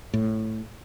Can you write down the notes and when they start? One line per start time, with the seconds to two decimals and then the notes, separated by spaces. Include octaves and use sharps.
0.14 A2